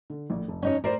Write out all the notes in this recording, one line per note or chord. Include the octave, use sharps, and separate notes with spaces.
D3
A#1 A2
F1
C#4 D#4 C#5
A2 A#4 C5 D5 C7